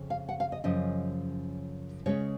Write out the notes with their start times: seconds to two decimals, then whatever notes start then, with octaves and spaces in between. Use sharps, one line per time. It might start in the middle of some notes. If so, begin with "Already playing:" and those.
Already playing: F2 C#3
0.10 F5
0.29 F#5
0.40 F5
0.52 D#5
0.64 F#2 C#3 F3 D#5
2.06 C#3 G#3 C#4 C#5